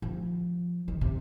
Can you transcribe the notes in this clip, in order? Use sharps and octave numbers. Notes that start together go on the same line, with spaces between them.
F3
D#3
C3